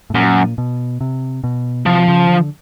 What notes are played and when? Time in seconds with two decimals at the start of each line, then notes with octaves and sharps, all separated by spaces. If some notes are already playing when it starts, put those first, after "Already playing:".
0.10 A2
0.14 F#2 A#2
0.58 B2
1.01 C3
1.44 B2
1.86 C3 F3
2.08 C#3
2.29 D3